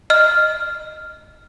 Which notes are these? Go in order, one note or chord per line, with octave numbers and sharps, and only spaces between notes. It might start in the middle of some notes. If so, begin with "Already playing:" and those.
D#5 F6